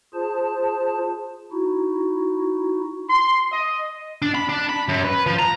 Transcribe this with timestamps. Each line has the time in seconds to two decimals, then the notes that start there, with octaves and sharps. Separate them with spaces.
0.14 F4 G#4 C5 A5
1.52 D#4 E4 F#4
3.09 C6
3.52 D#5
4.22 D4
4.35 B5
4.49 D4
4.69 B5
4.88 F#2
5.04 B4
5.26 F3
5.39 A#5